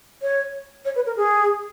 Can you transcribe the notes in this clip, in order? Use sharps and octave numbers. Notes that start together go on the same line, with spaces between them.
C#5
C#5
B4
A#4
G#4